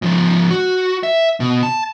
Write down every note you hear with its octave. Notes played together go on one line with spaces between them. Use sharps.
G#2 F3
F#4
E5
B2
A5